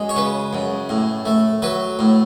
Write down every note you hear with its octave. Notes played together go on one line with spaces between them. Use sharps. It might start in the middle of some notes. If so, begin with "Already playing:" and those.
Already playing: F#2 G#3
C#5
C#3 B4
F#2
A2
A3
F#3 B4
A2